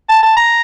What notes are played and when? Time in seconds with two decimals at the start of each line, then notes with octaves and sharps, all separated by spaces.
0.09 A5
0.23 A5
0.37 A#5